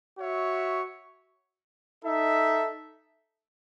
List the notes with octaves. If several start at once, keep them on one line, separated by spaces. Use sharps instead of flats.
F#4 C#5 E5
D#4 A4 E5